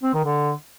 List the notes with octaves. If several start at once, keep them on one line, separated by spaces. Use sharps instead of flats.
C4
D#3
D3